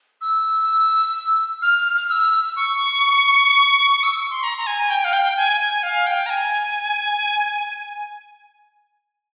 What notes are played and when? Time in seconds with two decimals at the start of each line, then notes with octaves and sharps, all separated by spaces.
0.21 E6
1.62 F6
1.96 F6
2.09 E6
2.56 C#6
4.03 E6
4.16 C#6
4.30 C6
4.43 A#5
4.58 A#5
4.67 G#5
4.90 G5
5.04 F5
5.13 G5
5.37 G#5
5.61 G#5
5.83 F5
6.07 G5
6.26 A#5
6.30 G#5